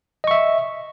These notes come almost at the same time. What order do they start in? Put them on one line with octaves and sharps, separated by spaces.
D#5 C#6 E5